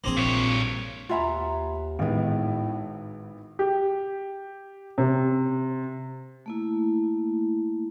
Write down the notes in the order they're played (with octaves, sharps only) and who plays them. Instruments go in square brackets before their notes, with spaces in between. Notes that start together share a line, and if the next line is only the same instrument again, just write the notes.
[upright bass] A#1 F3 [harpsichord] A#3 C4 G#4 [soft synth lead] G#6
[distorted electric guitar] G2 C#5 [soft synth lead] A#2
[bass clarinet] D#2 [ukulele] F4 E5 A#5 [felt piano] F#5 G#5 B5
[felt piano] G#1 B3 [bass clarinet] A2 [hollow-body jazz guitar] D#3 G#3
[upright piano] G4
C3
[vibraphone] A3 A#3 E4